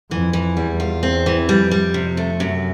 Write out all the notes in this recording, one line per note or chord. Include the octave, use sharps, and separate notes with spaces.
F2 E3
E3
E2 G3
F4
C4
E3
F2 G3
G3
C3
A3
F#2 C3